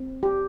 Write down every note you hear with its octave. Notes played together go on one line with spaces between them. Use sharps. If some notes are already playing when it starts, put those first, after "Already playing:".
Already playing: C4
G4